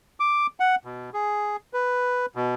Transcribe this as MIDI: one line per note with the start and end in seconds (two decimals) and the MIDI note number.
0.20 0.47 86
0.60 0.76 78
0.85 1.10 47
1.14 1.56 68
1.73 2.26 71
2.35 2.55 47